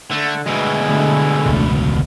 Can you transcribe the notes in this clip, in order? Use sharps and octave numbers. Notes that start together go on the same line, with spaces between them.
D3 A3
D2 B2 G#3 E4
D3 A3
E1 C#2